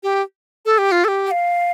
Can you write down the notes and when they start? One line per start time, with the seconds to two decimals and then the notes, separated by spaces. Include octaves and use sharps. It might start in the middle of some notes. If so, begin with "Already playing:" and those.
0.03 G4
0.65 A4
0.78 G4
0.92 F4
1.04 A4
1.08 G4
1.26 G5
1.31 F5